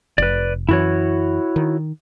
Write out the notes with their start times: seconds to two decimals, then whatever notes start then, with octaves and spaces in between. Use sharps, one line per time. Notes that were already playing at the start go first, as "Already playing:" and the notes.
0.18 F1 B4 D5
0.69 F#2 E3 E4 F#4 C#5
1.56 D#3